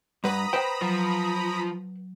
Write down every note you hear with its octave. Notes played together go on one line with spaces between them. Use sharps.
G2 B4 F#5 A#5 B5 D#6
B4 C5 G5
F3 F#3